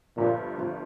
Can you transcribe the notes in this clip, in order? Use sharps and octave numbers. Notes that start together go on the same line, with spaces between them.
G1 G2 A#2 F3
G1 G2 F3